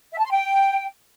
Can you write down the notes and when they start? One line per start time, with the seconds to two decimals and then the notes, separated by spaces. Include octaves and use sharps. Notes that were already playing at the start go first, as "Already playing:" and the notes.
0.12 E5
0.19 A5
0.25 C6
0.31 G5